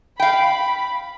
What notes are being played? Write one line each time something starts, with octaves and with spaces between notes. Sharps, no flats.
F5 G5 B5